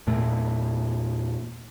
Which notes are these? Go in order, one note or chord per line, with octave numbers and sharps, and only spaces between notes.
E2 A#2 A3